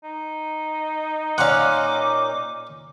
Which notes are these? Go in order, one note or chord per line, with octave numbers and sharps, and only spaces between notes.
D#4
A#2 C#4 F5 F#5 D6